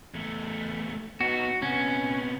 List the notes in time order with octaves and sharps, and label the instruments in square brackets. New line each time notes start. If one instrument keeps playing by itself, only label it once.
[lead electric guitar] E2 A3
[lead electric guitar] B3 D#4 [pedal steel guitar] F#4
[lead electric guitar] C3 B3 [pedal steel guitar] C#4